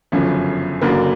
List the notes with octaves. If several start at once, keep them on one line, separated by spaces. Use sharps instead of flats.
G1 F#2 C#3 F3 A3
F#1 F#2 D3 F#3 A#3